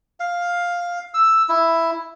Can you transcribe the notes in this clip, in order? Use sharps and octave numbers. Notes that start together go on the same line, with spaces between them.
F5
E6
E4